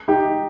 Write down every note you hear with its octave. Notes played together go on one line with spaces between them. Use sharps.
D#4 G4